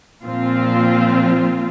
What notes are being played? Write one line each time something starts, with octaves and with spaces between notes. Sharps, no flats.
A#2 F3 C4 F4